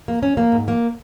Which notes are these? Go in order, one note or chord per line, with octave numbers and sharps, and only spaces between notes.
A#3
C#4
A#3
G#2
A#3